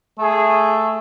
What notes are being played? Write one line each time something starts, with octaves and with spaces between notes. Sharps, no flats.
A3 G#4